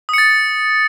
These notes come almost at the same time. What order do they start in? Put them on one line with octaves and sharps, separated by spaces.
D#6 C#7 A6